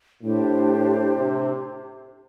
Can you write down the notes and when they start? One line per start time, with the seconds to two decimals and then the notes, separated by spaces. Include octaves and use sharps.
0.23 A2 D4 G4 C5
1.17 C3